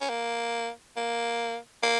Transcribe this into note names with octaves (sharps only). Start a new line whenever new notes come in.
C#4
A#3
A#3
A#3